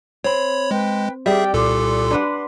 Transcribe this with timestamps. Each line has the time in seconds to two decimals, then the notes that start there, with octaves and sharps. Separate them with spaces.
0.24 C4 C#5 B5
0.71 G#3 B4 G5
1.26 G3 G#4 D5 E5 G5
1.54 C2 A#2 A4 C6 D6
2.11 D4 B4 F#5